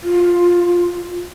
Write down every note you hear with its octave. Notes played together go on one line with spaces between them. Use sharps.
F4